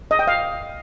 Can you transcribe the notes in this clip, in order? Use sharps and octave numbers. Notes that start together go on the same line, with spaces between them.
D#5
G5
F5